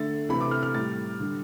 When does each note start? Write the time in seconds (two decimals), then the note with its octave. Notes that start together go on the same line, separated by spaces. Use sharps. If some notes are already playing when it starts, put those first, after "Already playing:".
Already playing: D3 A3 A6
0.29 C3 E3 A3 B5
0.41 D6
0.51 F6
0.63 F6
0.74 A2 G3 A6
1.20 D3 G3